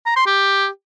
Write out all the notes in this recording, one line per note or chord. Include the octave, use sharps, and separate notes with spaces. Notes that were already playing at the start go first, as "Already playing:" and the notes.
A#5
C6
G4